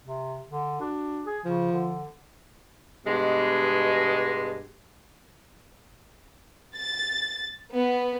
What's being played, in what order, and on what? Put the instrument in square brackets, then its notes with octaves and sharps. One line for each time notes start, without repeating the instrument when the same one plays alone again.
[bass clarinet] C3
D3
[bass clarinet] D4 [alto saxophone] F#4
[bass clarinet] G#4
[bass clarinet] C#3 [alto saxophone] F3
[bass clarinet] D3
[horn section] G2 B2 G#3
[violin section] A6
B3